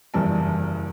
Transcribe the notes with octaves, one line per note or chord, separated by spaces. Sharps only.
F#1 E2 G2 A5